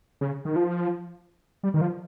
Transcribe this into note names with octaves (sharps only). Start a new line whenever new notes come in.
C#3
D#3
F3
G3
D#3
F3